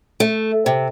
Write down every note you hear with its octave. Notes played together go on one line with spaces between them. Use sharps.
A3
C3